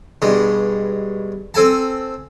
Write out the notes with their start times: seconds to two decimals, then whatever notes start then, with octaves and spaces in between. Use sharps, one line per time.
0.22 G2 B2 G#3
1.54 C4 A4 G#5 A5